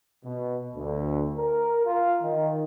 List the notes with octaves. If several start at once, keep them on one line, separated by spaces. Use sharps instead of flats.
B2
D2
A#4
F4
D#3